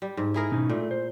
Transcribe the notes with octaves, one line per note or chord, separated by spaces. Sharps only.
G3
G#2
E4 G#4 A#4
B2 C#4 D#4
A#2 A3
C5